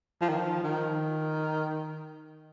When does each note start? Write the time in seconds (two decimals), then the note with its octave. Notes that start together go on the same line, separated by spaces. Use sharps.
0.21 F3
0.29 D#3
0.37 F3
0.63 D#3